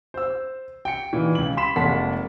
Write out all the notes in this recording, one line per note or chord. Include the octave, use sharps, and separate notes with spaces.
C5 E6
G5 C#7
A#2 D#3 E3
C#2 F#7
B5 C6 B6 E7
F1 G#3 A#3 F#5 A5 B6